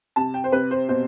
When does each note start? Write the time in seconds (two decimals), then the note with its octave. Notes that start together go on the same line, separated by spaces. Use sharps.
0.16 C3 A5
0.34 G5
0.44 C5
0.52 C3 B4
0.71 C5
0.89 B2 C5